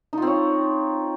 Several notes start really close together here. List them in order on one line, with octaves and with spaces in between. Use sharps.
D#4 F4 C4 C#5